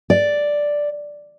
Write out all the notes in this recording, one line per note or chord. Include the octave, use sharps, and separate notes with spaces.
D5